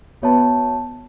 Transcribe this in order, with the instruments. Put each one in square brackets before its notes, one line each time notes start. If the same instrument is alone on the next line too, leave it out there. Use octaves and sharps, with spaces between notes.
[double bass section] B3 [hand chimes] F#4 C#5 E5 A5